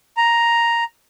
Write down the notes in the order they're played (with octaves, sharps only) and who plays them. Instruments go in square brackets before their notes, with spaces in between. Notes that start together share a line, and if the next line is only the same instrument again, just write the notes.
[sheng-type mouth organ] A#5